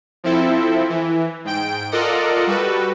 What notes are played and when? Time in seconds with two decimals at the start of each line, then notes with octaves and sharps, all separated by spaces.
0.24 F3 C4 E4 A4
0.89 E3
1.45 G#2 G5 D7
1.92 F4 A4 A#4 D5 D#5 F#5
2.47 G3 F#4 A4 B4